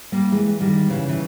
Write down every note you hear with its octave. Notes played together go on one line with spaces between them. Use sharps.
G3 A#3
E3 G#3
D#3 G3
C#3 E3
E3